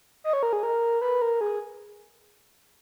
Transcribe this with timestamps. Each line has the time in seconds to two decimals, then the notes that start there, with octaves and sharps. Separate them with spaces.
0.24 D#5
0.33 C#5
0.43 A#4
0.53 G#4
0.63 A#4
1.01 B4
1.22 A#4
1.41 G#4